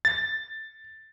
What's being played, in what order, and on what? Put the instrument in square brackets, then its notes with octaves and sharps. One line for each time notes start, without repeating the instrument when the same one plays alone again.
[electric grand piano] A6